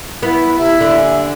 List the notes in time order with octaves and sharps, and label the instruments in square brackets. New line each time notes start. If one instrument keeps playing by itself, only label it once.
[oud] B3 [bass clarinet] E4 [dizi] B4
[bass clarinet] C3 [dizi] E4 [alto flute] E5
[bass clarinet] D#2 [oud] D3
[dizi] G#5